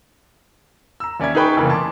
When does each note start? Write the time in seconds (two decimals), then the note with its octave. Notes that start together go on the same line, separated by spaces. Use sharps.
1.00 A#5 E6
1.20 D#2 C#4 D5 E5 G#6
1.35 D#4 G#4 B4 G5 B5 C#6
1.57 F1 C#3 E3 A#3
1.70 A5 C6 D6